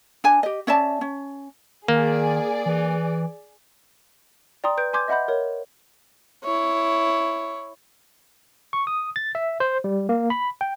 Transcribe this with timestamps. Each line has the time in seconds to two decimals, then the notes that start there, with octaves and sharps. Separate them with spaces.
0.24 D4 G#5
0.43 G4 D#5
0.67 C#4 D5 E5 A5
1.01 C#4
1.88 D#3 A#3 G#4 D5
2.66 E3
4.64 D5 G5 A#5 C6 D#6
4.77 B4 G6 D7
4.93 G#5 C6 D6 G6 G#6
5.08 D#5 E5 F#5 B5 G6
5.28 A#4 C#5
6.44 E4 C#5
8.73 C#6
8.87 D#6
9.16 A6
9.35 E5
9.60 C5
9.84 G3
10.09 A#3
10.30 B5
10.61 G5